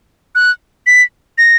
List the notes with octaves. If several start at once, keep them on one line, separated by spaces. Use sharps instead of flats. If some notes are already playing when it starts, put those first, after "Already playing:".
F#6
B6
A#6